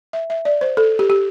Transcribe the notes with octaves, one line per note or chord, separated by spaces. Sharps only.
E5
E5
D5
C5
A4
G4
G4